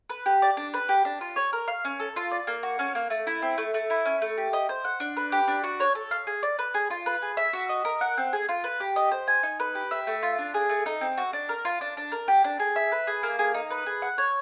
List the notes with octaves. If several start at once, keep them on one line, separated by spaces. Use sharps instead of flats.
B4
G4
D5
D4
B4
G4
D4
F4
C#5
A#4
F5
C#4
A4
F4
D5
A#3
F#4
C#4
A#3
A3
E4
C4
A3
A3
E4
C#4
A3
G4
D#5
C5
F#5
D4
B4
G4
D4
F#4
C#5
A4
F5
G#4
D5
B4
G#4
F4
B4
G#4
E5
F#4
D#5
A#4
F#5
C4
G#4
F4
B4
G4
D#5
C5
G#5
D#4
B4
G4
E5
A3
F4
D4
G#4
A3
D#4
C4
F#4
D4
A#4
F4
D4
D4
A#4
G4
D4
G#4
E5
B4
G#4
A#3
G#4
D#4
B4
G#4
F#5
C#5